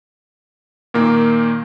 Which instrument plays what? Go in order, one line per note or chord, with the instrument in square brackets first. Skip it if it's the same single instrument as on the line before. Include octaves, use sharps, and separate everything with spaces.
[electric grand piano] A#2 D#3 A#3